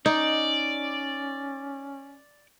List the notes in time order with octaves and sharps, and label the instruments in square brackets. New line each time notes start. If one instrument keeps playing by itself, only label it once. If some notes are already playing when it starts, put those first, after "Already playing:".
[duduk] C#4 [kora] D#4 [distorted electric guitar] D5